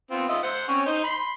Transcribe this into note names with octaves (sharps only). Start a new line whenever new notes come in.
B3 C4 F4
F4 D#5 E5
C5 F#5
C4 C#4 C#5
D#4 C5
B5 C6